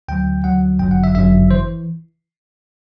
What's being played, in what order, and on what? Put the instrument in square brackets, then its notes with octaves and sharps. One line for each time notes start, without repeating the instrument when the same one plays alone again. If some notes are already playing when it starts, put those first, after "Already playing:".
[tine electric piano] D2 D3 F#3 G5
D2 D3 F#3 F#5
G1 F#2 D3 F#3 G5
F#5
E5
G1 F#2 D3 F#3 E5
E3 C5